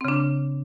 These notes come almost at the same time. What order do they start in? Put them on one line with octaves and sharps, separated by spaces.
C4 C#3 D4